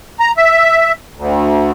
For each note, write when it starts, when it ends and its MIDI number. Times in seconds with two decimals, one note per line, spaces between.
0.20 0.31 82
0.37 0.92 76
1.16 1.71 38